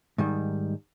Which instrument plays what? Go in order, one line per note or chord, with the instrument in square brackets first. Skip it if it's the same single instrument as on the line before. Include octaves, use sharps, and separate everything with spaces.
[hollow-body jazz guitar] G#2 D#3 G3